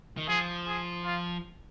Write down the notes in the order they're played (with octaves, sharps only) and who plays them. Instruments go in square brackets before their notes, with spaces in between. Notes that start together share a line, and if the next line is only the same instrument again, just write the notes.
[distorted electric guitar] D#3
[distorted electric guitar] F3 [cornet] G#4
[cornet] G#4
F4